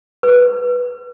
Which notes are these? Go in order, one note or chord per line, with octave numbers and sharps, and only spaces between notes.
B4